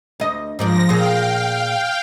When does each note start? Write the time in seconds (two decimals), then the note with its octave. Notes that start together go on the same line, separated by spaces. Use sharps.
0.20 D2 D#5
0.59 G#2 F3 D4 D5 A#6
0.89 A#2 G#4 F5 G5